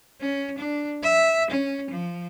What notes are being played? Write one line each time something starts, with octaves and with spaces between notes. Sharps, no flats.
C#4
D4
E5
C#4
F3